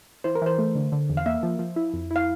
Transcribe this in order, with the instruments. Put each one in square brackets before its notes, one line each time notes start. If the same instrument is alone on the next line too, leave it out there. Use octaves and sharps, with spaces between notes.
[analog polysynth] E3 [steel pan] C5
[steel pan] A#4
[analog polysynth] E3 [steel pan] C5
[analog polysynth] A3
D3
D3
E2
[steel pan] F5
[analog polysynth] A#3 [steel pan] E5
[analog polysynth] F3
F3
E4
F2
E4
[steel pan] F5